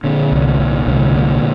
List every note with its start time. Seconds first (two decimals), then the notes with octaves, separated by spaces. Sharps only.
0.04 A#2 D3
0.32 C2
0.59 A#2
0.87 C2 D3
1.15 A#2